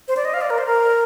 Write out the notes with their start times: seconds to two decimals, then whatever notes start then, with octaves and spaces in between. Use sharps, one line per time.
0.08 C5
0.17 D5
0.25 D#5
0.34 F5
0.41 D5
0.50 A#4
0.58 C5
0.67 A#4